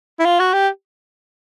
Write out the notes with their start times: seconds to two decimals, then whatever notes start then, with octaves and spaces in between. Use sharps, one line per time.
0.19 E4
0.25 F4
0.40 F#4
0.54 G4